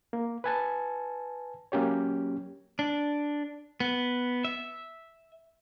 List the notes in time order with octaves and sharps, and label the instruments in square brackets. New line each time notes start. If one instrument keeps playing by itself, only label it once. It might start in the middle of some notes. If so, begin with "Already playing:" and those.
[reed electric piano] A#3
B4 G#5 A5
F#3 A#3 C#4 G4 C#5
[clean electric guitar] D4
B3
E5